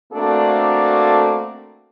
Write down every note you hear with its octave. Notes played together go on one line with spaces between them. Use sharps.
A3 A#3 C4 D4 F#4 A4